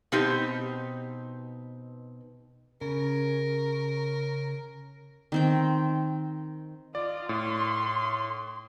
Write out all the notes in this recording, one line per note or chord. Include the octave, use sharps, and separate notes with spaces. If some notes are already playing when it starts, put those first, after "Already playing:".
B2 C4 D#4 G4
C#3 A#4
D#3 C4 G5
F4 D5 D#5
A2 C6